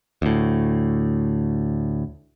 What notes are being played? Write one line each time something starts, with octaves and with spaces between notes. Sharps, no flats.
D2 A2